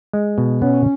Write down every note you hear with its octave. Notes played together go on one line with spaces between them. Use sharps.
G#3
B2
B3 C#4